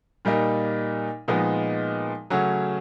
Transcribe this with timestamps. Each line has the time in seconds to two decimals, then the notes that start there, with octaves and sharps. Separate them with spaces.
0.25 A#2 G3 A#3 D#4
1.28 A#2 F3 G#3 B3 D#4
2.30 C#3 F#3 A3 C#4 F#4